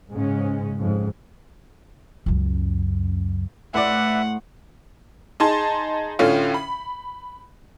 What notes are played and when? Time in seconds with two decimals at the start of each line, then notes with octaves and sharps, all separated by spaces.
0.10 G#2 C#3 G#3 C#4
0.80 F2 G#2
2.26 C#2 F#2
3.74 A2 E4 B4 D5 E5 F#5 C6
5.40 D#4 G#4 A5 C6
6.19 A2 D3 C#4 F4
6.54 B5